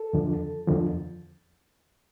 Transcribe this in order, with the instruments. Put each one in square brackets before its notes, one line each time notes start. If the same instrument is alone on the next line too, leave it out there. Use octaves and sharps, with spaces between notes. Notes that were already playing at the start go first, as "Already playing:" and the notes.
Already playing: [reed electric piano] A4
E2 D3 F3
E2 D3 F3